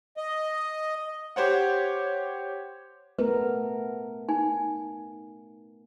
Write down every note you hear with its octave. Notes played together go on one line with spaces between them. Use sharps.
D#5
G4 C5 C#5 F#5
A3 B3 A#4 B4
D#4 G#5